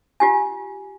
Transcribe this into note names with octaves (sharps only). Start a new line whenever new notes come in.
F4 G4 G#5